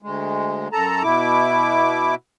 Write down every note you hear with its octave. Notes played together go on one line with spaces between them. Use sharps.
D2 G#3
F#2 A4 A5 A#5
B2 E4 D6